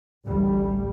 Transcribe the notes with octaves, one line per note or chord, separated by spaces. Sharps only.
A1 D2 G3